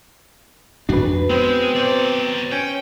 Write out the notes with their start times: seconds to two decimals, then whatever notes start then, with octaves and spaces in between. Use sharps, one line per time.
0.89 F2 D4 F#4 B4
1.30 G#3 B3 C4
1.76 F#3 C4 D5
2.52 C#4 G5